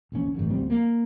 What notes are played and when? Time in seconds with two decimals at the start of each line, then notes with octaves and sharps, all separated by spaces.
0.12 E1 A#1 C#4
0.35 A1 G2 D3
0.50 D2 F3 G3 C4
0.70 A#3